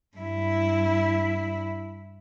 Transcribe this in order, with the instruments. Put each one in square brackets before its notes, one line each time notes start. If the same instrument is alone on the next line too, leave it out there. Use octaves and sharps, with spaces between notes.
[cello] G2 E4